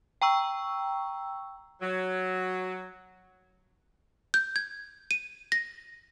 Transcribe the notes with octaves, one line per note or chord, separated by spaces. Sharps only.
G5 A#5 C#6 E6
F#3
G6
G#6
D#7
A#6